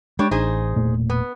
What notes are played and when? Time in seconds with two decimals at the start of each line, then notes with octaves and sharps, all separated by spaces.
0.19 G3 G#3 D4 C#5
0.31 A1 D#4 G#4 C5
0.76 E1 A#2 A3
1.10 B3